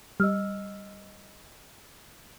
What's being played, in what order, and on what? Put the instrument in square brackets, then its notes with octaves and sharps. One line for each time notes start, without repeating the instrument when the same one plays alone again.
[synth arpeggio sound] G3 [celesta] D#5 E6 F6